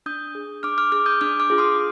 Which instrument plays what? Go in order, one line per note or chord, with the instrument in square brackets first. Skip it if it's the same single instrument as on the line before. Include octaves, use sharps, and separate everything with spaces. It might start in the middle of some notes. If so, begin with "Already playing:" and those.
[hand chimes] D4 D#6 G6
G#4
D4 D6 F6
D6 F6
G#4 D6 F6
D#6 G6
D4 D6 F6
D6 F6
F4 G#4
C6 D#6